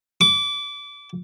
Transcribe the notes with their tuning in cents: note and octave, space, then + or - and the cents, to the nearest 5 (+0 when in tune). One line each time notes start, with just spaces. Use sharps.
D6 -25